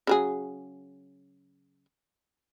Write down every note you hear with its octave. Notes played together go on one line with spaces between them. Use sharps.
C#3 F#3 G#4